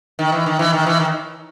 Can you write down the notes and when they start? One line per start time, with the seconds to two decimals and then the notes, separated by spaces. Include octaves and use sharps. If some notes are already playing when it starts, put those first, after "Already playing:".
0.19 D#3
0.32 E3
0.46 D#3
0.59 E3
0.73 D#3
0.86 E3
1.00 D#3